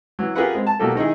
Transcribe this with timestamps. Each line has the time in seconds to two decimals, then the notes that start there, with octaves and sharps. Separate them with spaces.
0.19 E3 F#3
0.35 F4 G4 G#4 A#4 B4 F#5
0.55 G#3 C4
0.67 A5
0.80 B2 F#3 A#3 G4 A4
0.95 D#3 D#4 E4 G#4